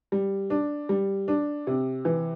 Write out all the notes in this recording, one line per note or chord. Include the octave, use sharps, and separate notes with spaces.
G3
D4
G3
D4
C3
E3